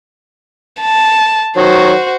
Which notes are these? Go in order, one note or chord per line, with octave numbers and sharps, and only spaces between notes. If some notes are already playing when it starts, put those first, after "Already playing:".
A5
D#3 F#3 F#4 C5